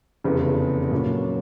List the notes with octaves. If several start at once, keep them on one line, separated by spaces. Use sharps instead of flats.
F1 E2 C#3
A#2 F#3 A#3 C#4